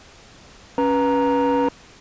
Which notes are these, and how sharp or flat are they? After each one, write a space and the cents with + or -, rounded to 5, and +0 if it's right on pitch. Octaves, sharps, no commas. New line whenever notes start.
C#4 +0 B4 -20 A#5 +0